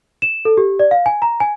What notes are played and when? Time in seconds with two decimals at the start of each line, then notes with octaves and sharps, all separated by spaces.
0.22 E7
0.45 A4
0.57 G4
0.79 D5
0.91 F5
1.06 G#5
1.22 A#5
1.40 G#5